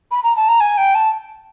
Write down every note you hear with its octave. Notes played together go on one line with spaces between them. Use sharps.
B5
A#5
A5
A#5
G#5
G5
A5